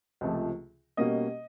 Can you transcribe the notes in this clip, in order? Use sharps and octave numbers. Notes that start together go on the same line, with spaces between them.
C#2 C3 F3 A3
B2 G3 A#3 C#4 D#5